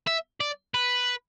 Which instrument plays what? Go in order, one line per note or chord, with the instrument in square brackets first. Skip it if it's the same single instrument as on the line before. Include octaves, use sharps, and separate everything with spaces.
[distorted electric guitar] E5
D5
B4